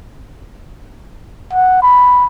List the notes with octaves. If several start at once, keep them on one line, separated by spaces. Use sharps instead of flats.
F#5
B5